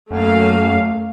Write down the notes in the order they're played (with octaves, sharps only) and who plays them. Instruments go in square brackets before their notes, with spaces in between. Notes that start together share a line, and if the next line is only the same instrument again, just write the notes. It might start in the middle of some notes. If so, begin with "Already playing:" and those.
[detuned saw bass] F#2 [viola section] A3 A#3 F5